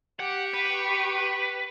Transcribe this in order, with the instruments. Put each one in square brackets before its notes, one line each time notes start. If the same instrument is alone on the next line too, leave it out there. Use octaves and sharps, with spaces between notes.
[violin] G4 C#6 [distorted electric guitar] F#5
[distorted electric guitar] B4